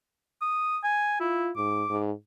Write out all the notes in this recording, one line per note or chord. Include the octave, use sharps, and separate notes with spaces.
D#6
G#5
E4 F4
G#2 D6
G#2